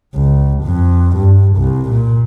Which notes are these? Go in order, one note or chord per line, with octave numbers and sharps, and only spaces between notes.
C#2
F2
G2
C2
A#2